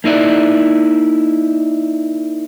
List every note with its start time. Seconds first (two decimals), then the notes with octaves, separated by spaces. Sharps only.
0.04 A#3 D#4 E4 D5